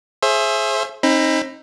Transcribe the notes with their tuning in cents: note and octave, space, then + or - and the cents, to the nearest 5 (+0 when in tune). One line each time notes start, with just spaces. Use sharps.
G#4 +25 C5 +30 E5 +15
C4 +35 D#4 +5 B5 +15